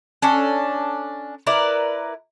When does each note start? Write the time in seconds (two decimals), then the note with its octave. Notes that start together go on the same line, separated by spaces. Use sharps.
0.22 C#4 D4 A4
1.47 E4 A#4 B4 D5